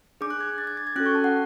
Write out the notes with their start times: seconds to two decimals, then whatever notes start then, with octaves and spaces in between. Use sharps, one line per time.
0.21 D4 G#4 D6
0.30 F#6
0.40 G#6
0.58 A6
0.67 G#6
0.77 A6
0.87 G#6
0.96 C#4 F#4 A4 F#6
1.06 C#6
1.15 A5
1.24 F#5